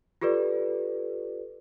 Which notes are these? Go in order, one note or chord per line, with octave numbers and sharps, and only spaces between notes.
F4 G4 A4 B4 D5